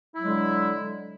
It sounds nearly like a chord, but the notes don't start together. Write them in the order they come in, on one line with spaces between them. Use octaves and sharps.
E4 F#3 G#3 D3